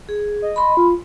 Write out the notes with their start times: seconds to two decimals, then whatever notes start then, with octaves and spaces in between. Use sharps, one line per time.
0.09 G#4
0.42 D#5
0.56 B5 C6
0.77 F4